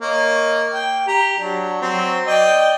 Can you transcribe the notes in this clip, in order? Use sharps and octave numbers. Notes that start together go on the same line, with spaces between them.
A#3 C#5 D#5
G5
G4 A#5
F#3 D4
F#3 C4
D5 D#5 G5